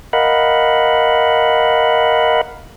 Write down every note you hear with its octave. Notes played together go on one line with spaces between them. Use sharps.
A#4 D#5 F5 F#5 B5